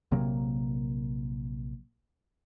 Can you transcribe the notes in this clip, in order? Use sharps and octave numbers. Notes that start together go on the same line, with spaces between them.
A#1 C3 F#3 A#3